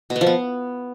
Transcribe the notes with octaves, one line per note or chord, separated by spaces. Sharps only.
B2
B3
F3
B3